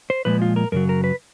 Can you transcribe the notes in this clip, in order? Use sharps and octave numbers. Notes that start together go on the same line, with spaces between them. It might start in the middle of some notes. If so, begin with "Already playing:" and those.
C5
A#2 F3 G#3 B4
F4
A#4
F#2 C#3 F#3 A#4
A#4
B4